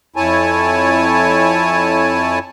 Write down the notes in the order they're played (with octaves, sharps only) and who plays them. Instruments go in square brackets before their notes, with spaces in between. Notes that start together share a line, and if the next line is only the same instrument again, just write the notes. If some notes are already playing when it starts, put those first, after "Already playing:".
[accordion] F2 E4 C#5 G#5 A5